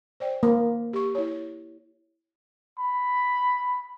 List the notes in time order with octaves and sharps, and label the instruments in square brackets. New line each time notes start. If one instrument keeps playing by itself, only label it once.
[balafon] C5 D5 G5
[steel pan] A#3
[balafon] G4 C#6
E4 C#5
[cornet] B5